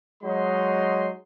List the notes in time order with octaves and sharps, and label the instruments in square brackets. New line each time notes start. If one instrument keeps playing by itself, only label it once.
[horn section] F#3 G#3 D#4 C6